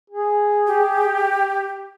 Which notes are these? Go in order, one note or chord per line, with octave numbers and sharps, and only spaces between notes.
G#4
G4